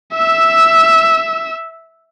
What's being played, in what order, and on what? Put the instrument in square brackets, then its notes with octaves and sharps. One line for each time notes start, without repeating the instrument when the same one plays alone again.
[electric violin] E5 E6